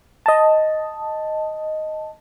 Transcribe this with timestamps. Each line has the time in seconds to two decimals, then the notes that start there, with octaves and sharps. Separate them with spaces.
0.26 D#5 A5